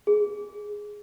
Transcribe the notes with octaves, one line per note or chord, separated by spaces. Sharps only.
G#4